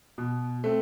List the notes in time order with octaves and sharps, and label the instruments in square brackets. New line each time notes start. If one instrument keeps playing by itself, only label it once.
[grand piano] B2
A3 C4